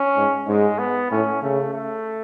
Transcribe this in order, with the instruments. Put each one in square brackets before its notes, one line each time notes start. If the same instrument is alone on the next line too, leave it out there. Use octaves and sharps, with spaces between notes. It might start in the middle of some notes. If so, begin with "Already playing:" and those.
Already playing: [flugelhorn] C#4
[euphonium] G#2
[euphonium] G#2 [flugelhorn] G#3
[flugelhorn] B3
[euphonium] A2 [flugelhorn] C#4
[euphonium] C#3 [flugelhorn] A3
[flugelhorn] A3